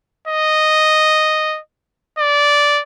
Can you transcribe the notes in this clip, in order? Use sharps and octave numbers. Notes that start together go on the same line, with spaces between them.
D#5
D5